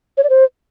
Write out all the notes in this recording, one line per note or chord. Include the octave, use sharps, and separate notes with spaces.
C#5
D5
C5